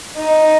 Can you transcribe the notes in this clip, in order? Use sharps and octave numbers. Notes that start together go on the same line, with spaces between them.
D#4